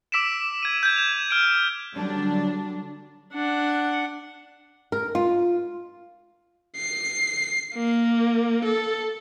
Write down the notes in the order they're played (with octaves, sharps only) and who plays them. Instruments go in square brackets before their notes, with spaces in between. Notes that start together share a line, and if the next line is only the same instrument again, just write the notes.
[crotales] D6 E6 B6 D7 E7
G#6 D#7
G6 G#6
G#6 E7 F7
F6 D7
[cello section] D3 F#3 G3 D4
[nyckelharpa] D4 F#5
[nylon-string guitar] A#4
F4
[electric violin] C7
A#3
A4